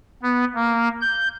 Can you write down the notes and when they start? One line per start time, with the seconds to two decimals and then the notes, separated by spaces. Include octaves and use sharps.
0.23 B3
0.55 A#3
1.01 G6